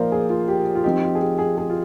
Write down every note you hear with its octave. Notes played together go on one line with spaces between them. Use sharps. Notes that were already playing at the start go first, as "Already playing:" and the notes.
Already playing: A#2 F3 A#3 D#4 A#4 C5 D5 F5
G#4
F4
G4
F4
F3 C4 D#4 G4
F4
G#4
G4
G#4
G#4
F4